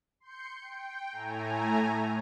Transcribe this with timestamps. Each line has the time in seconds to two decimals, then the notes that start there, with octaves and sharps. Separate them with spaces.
0.20 C6 G6 C#7
0.61 G5
1.11 A2 A3 G#5 A#5